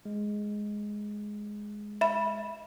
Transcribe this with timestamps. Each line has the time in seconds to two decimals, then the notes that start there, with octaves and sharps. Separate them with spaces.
0.05 G#3
2.01 E5 B5 E7